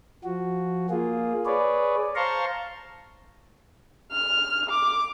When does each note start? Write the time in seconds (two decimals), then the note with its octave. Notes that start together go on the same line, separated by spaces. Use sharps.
0.24 F3 F#4
0.90 A#3 F4 G#4
1.46 G#4 B4 C#5 D5
2.15 C5 F5 A5 A#5 C6 C#6
4.12 F6
4.70 D6